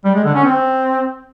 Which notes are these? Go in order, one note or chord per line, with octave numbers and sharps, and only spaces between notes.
G3
G#3
D3
C#4
C4